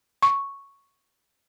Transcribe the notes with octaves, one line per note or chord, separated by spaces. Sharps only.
C#6